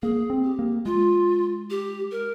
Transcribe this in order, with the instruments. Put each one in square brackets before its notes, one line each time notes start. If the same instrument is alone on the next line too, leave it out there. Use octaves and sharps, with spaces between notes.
[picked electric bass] A#3 [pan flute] G#4
[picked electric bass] C4
[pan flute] G4
[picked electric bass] A#3
[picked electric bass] G#3 [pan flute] F4
[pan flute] G4
A#4